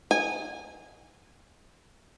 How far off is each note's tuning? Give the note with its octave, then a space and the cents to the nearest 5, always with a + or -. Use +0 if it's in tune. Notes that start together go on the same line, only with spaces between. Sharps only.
G#5 -20